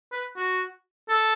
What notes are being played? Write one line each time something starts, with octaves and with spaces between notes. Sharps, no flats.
B4
F#4
A4